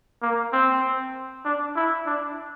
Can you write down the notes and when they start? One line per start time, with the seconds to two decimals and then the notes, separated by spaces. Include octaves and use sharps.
0.22 A#3
0.53 C4
1.45 D4
1.76 E4
2.06 D4